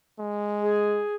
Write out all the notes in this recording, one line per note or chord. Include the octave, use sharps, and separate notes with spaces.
G#3
G#4